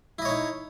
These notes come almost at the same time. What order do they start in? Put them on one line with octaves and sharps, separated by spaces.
E4 D#5 C#5 D#4